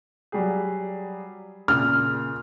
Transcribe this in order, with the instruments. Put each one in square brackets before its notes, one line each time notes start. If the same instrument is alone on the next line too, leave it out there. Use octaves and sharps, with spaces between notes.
[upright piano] F#3 G3 G#4
[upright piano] A#2 C#3 [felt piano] F6